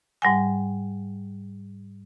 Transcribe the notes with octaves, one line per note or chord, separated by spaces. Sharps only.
G#2 G3 F#5 G#5